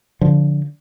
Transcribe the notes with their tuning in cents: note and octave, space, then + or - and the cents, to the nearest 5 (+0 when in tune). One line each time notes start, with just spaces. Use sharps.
D3 -20 F3 +0